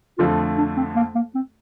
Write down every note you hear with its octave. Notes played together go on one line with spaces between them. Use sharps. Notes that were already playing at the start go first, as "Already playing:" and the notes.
F2 D3 F3 A3 F4
D4
C4
A#3
A#3
C4